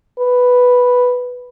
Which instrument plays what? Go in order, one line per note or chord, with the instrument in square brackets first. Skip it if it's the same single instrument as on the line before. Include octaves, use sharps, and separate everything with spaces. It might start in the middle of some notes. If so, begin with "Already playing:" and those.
[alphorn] B4